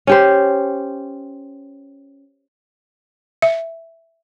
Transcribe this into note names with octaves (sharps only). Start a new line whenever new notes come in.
C#4 G4 C5
E5